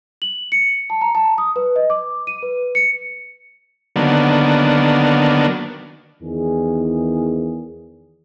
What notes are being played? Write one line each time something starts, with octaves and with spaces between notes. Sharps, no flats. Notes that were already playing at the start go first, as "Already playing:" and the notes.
F#7
C#7
A5
A#5
A5
D#6
B4
D#5
D6
D#7
B4
C#7
D3 D#3 F#3 A#3 B3 D4
E2 D#3 G#4